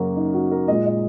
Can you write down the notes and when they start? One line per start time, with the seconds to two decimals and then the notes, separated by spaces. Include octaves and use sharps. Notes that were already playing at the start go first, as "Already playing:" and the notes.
Already playing: F#2 C#3 F#3 A#3 F#4
0.16 D#4
0.34 F#4
0.51 A#4
0.68 A#2 G#3 D#5
0.86 D#5